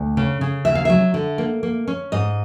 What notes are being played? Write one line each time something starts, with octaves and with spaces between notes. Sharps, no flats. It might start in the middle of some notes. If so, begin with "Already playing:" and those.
Already playing: D2
C#3
C#3
D#2 E5
F5
F#3 E5
D3
A#3
A#3
C#4
G#2 D#5